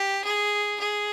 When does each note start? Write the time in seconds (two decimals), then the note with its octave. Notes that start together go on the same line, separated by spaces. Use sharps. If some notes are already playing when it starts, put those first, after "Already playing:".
Already playing: G4
0.24 G#4
0.80 G#4